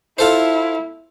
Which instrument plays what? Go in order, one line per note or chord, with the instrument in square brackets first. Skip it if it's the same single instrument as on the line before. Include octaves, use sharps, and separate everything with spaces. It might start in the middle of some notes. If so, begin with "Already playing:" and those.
[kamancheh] E4 [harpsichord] F4 A4 C5